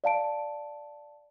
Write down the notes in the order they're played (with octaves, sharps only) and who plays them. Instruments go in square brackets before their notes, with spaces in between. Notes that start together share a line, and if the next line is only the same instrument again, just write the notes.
[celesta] D5 F5 A5 D7